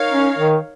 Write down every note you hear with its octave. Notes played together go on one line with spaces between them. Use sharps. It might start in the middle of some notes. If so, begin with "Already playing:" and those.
Already playing: D#4 A#4 C#5 F5
C#4
D#3